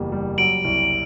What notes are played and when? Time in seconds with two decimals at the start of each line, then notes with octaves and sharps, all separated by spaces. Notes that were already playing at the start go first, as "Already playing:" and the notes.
Already playing: F#1 E2 G3
0.12 G3
0.38 F#3 D7 F#7
0.65 C2